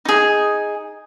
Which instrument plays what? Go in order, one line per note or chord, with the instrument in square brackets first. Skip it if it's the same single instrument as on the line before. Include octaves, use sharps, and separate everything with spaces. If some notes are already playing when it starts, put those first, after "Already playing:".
[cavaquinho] D#4 G#4